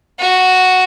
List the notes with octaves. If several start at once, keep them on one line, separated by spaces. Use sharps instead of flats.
F#4